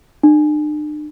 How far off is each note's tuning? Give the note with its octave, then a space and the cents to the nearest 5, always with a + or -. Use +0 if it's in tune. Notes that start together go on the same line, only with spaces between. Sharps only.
D4 +45